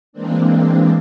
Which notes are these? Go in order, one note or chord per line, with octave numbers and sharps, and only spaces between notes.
E3 G#3 A#3 C4 D4